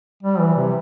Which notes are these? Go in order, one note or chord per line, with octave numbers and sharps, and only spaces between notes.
G3
E3
C3